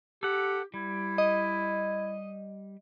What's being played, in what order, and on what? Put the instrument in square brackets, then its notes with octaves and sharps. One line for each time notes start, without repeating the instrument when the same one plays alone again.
[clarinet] G4 [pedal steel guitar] A4 F#5
[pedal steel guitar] G3 [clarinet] E4
[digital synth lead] D#5